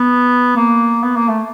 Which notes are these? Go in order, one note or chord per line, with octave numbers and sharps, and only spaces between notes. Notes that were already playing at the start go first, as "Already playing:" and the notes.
Already playing: B3
A#3
B3
A#3
A3